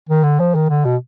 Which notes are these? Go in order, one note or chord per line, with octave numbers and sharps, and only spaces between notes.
D#3
D3
F3
D#3
D3
B2